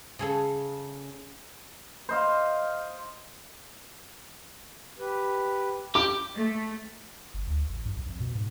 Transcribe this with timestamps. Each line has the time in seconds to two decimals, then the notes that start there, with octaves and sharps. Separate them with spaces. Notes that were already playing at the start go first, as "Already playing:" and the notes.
0.19 C#3 G#4 A4
2.09 C5 D#5 F5
4.99 G4 B4
5.95 G4 D6
6.35 A3
7.34 G1
7.47 D2
7.69 A1
7.85 G2
7.97 B1
8.09 F2
8.20 B2
8.35 G#2